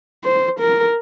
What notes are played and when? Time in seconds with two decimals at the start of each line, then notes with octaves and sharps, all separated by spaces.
0.24 C5
0.60 A#4